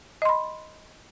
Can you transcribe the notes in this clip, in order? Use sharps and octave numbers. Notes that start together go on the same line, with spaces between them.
D#5 B5 C6